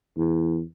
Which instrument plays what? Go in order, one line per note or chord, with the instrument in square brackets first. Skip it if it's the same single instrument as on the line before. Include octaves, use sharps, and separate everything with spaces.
[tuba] E2